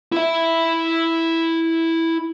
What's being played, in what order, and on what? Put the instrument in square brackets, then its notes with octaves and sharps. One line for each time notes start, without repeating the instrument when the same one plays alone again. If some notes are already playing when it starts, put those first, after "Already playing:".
[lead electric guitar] E4 E5